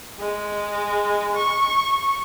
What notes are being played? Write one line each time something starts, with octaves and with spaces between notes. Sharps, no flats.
G#3
C#6